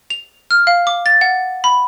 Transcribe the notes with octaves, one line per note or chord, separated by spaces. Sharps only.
F7
F6
F5
D6
A6
F#5
B5